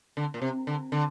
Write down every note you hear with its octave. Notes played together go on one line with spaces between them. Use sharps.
D3
A#2
C3
D3
D3